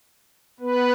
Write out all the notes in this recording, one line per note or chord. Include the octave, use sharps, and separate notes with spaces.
B3 B4